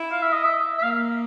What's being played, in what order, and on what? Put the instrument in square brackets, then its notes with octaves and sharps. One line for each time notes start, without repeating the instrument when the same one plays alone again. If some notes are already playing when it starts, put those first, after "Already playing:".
Already playing: [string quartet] E4
[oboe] F5
E5
D#5
E5
E5
[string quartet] A#3 [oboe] F5